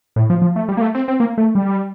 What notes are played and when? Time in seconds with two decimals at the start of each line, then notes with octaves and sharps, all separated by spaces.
0.16 A2
0.30 F3
0.42 F3
0.56 A3
0.68 G3
0.77 A#3
0.81 A3
0.94 C4
1.08 C4
1.20 A#3
1.38 A3
1.55 G3